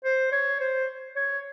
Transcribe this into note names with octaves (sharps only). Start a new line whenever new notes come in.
C5
C#5
C5
C#5